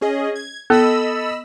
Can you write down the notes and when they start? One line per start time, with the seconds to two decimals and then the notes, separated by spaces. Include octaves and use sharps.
0.01 C#4 G#4 D#5
0.35 G#6
0.70 B3 A4 D#5 B5 E6